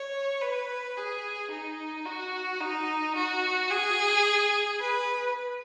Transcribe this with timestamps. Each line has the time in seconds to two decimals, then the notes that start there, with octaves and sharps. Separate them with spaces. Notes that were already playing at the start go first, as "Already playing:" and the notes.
Already playing: C#5
0.41 B4
0.97 G#4
1.51 D#4
2.06 F#4
2.61 D#4
3.16 F#4
3.70 G#4
4.80 B4